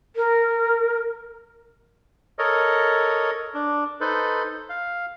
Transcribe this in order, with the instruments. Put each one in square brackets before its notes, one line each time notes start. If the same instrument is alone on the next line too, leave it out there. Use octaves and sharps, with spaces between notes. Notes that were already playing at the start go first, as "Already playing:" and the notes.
[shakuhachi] A#4
[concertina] A4 A#4 C#5 D#5
D4
D#4 A4 B4 C5
F5